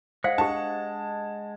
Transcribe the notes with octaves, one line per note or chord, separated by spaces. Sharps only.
G#3 C5 D#5 F5 F#5
D4 G4 A5